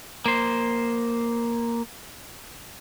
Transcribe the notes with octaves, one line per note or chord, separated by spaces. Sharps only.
A#3 C5